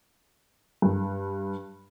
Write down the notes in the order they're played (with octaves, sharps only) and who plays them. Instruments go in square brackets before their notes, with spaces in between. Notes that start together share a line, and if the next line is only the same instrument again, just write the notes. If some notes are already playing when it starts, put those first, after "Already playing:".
[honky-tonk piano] G2